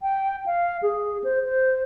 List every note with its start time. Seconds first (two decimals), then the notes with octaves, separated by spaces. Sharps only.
0.02 G5
0.46 F5
0.82 G#4
1.24 C5
1.45 C5